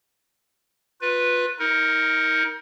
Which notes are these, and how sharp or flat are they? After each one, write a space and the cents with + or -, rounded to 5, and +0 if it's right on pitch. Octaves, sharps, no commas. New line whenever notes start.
F4 +25 B4 +0
D#4 +25 A#4 +0